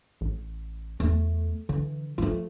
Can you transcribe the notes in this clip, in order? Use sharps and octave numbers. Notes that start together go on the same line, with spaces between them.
A1
E2 A3
D3 E3
F3 A3 F4